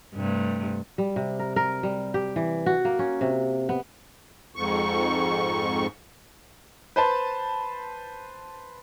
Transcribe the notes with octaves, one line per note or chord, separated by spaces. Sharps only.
G2 C3 A3
G3
C3
A#4
A#4
G3
G4
E3
F#4
A#3
C#4
C3
B3
F2 G#2 C#6
B4 C5 A5